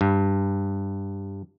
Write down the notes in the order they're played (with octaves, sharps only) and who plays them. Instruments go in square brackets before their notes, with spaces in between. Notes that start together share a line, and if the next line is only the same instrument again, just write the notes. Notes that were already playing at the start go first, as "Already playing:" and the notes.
[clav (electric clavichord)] G2